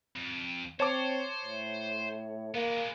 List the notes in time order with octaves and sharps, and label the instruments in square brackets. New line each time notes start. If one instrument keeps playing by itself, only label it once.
[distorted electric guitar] F2
[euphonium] C4 [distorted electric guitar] C5 [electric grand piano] C#5 A5 D6
[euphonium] A2
[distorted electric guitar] G#3 B3 [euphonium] A#3